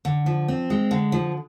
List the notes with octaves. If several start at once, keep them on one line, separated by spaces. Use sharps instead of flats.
D3
F3
C4
G#3
D3
F3